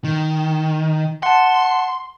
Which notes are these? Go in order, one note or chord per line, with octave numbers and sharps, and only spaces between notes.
D#3
F#5 A5 C6